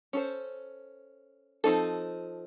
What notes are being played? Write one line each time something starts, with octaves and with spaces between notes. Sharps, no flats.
C#4 A4 C5
F3 C4 D#4 A4